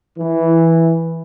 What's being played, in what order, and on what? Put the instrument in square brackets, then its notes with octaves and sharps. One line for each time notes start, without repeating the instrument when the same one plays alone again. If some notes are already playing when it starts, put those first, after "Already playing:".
[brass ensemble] E3